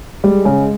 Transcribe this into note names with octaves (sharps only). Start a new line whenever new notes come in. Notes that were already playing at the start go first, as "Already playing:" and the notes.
G3 G#3
C#3 G#3